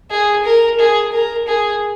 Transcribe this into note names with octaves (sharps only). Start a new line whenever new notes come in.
G#4
A#4
G#4
A#4
G#4